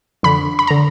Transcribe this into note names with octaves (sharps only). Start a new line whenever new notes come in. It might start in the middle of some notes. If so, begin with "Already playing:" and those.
F2 D3 B5
B5
D3 A#5